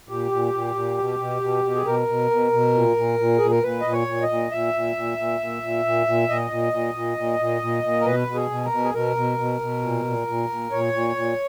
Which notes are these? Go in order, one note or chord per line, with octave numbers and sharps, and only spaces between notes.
A#2 G4
A#2
A#2
A#2
B2
B2
B2
B2
G#4
B2 A#4
B2
B2
B2
A#2
A#2
A#2
A#2 G#4
A#4
A#2 B4
A#2 D#5
C#5
A#2
D#5
A#2
A#2 E5
A#2
A#2
A#2
A#2
A#2
A#2
A#2
A#2 D#5
A#2
A#2
A#2
A#2
A#2
A#2
A#2
A#4
B2 B4
B2
G#4
B2
A#4
B2
G#4
B2 A#4
B2
B2
B2
A#2
A#2
A#2
A#2
A#2 C#5
A#2
A#2